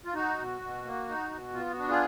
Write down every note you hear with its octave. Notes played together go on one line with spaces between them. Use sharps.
F4
D#4 F#4
B2
B2
A#3
D#4
B2
B3 F4
F#4
D4
F4 G#4